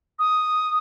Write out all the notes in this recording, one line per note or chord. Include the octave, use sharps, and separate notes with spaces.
D#6